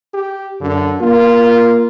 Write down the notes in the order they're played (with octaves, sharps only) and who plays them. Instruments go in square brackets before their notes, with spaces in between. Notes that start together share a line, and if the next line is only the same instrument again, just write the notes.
[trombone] G4
[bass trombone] F#2 [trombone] D3
[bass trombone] A#3 [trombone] F4